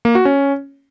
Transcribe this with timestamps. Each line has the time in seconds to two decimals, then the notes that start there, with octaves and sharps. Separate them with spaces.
0.05 A#3
0.15 F#4
0.25 C#4